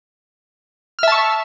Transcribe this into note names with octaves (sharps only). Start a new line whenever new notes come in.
E5 A5 C#6 F6